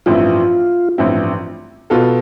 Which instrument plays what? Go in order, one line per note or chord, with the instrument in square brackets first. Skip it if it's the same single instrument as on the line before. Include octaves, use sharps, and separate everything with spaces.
[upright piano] A1 G2 F3 C4 E4 [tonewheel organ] F4
[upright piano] A1 G2 F3 C4 E4
B2 B3 F4 A4